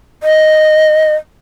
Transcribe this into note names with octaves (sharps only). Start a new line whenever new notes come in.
D#5